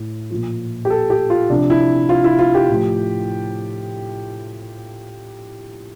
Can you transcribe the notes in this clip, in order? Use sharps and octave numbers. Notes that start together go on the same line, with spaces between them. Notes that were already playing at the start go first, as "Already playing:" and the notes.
Already playing: A2
A#2 F3
G4
A4
G4
F4
C3 F3 D4
E4
F4
E4
F4
G4
A2 F3